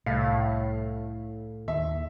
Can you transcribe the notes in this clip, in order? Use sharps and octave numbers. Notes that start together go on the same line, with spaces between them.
C2 A2 F5
D#2 E5